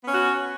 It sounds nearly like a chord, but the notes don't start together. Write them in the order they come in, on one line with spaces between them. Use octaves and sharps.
B3 C#4 F#4